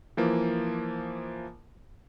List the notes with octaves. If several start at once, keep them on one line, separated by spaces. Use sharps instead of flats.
E3 F3 A#3